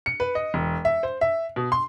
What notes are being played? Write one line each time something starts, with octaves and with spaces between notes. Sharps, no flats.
C#7
B4
D#5
E1
E5
C5
E5
B2
C6